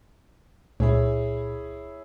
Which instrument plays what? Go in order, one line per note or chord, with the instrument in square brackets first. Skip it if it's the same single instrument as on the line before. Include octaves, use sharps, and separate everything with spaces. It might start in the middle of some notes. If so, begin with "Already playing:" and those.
[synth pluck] C#2 [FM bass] A#2 [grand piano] E4 G#4 C#5